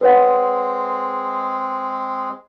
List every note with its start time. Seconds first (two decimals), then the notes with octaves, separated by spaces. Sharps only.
0.01 G#3 C4 G#4 B4 C#5 F#5